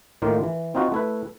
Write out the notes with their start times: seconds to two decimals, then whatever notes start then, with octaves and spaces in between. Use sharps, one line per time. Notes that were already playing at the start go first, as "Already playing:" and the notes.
0.22 A2 D#3 A#3 F4
0.43 E3
0.75 C4 D#4 F4 F#4
0.92 A3 E4 B4